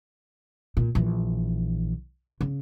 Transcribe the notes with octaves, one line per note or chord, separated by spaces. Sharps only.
A#2
A#1 E3
C#3